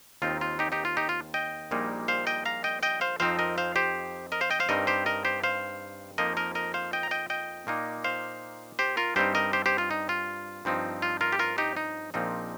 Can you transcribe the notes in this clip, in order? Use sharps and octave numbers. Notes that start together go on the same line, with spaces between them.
D#2 D#3 C4 D#4 F4
F4
D#4 G4
D#4 G4
F4
D#4 G4
F4
D#5 G5
A#1 A#2 G3 A#3 D#4
C5 F5
D#5 G5
F5 A#5
D#5 G5
D#5 G5
C5 F5
F2 F3 C4 D#4 C5 F5
A#4 D#5
C5 F5
G4 C5
A#4 D#5
C5 F5
D#5 G5
C5 F5
G2 G3 C4 D#4 A#4 D#5
G4 C5
A#4 D#5
G4 C5
C5 F5
F2 F3 A#3 D#4 A#4 D#5
A#4 D#5
A#4 D#5
C5 F5
D#5 G5
A#5
D#5 G5
D#5 G5
A#2 A#3 D#4
C5 F5
G4 C5
F4 A#4
G2 G3 C4 D#4 G4 C5
A#4 D#5
G4 C5
G4 C5
F4
D#4
F4
G2 F3 C4 D#4
F4
F4 A#4
G4
F4 A#4
D#4 G4
D#4
A#1 A#2 F3 C4 D#4